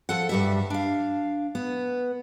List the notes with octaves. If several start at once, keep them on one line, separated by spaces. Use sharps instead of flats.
F3 A4 F#5
G2 G3 E5
D4 F5
B3